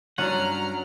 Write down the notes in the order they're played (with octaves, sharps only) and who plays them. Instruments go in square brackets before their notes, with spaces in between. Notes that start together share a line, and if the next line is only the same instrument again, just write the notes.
[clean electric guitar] G2 F#5 [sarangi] F#3 [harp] C#4 D4 [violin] A#5 F6